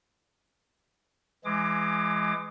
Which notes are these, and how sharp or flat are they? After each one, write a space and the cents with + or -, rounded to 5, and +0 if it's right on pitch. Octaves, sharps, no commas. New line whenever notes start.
E3 +30 G#3 +5 D6 +25